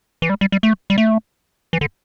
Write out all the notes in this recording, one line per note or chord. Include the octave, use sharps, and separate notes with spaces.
E3
G3
G3
G3
A3
G3
A3
E3
D3